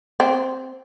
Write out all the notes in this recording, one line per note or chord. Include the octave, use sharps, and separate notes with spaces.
C4